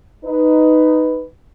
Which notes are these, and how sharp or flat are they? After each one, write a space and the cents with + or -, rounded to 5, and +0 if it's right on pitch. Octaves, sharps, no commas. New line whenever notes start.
D#4 +0 B4 +5